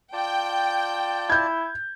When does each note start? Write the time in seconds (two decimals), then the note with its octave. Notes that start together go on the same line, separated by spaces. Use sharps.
0.13 F4 D5 G5 A5
1.30 E4 G6 G#6